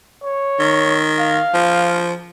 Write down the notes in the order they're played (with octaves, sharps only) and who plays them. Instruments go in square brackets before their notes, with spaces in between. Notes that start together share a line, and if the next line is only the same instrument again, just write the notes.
[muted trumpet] C#5
[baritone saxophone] D#3
[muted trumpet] F5
[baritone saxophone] F3